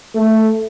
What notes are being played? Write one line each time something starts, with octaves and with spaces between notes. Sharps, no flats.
A3